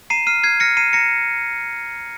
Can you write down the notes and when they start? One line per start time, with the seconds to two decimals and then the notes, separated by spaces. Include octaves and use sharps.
0.10 A#5 C7 D#7
0.27 F6 C7 D#7
0.43 F6 G#6 C7
0.60 F6 A#6 C#7
0.77 A#5 C7 D#7
0.93 A#5 A#6 C#7